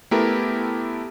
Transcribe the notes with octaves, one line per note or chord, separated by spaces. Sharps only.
A3 B3 E4 G4 A4 A#4